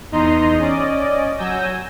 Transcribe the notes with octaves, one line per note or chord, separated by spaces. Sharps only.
E2 D#4 D#5 A#5 C6
C#4 D5 D#5
F#3 G#5 E6 G6 A#6